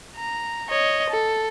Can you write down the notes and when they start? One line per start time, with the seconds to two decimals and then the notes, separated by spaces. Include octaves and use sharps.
0.17 A#5
0.70 C#5 D#5
1.10 A4